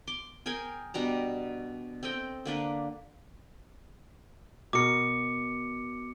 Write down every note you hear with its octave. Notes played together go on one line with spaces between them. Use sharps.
C6 D6
G#4 A#4 G5 G#5
B2 G3 D4 A#5
C4 A4 D#5 G5
D3 A#3 D4 B4
B2 A#4 D6 C#7